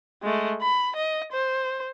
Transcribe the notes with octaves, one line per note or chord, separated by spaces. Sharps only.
G#3 A3
B5
D#5
C5